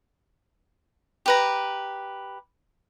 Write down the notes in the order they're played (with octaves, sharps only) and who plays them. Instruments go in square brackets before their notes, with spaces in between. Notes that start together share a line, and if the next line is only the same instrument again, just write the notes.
[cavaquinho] G4 B4 A#5